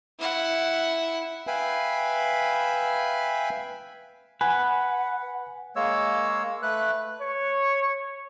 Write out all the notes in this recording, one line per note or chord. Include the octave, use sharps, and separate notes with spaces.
E4 F#5
B4 E5 F5 G5 G#5 B5
B4 F#5 G#5
G#3 A#3 C#5 E6
A3 B4 F#6
C#5